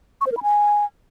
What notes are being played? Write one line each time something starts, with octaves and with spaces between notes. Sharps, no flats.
C#6
C5
A#4
B5
G#5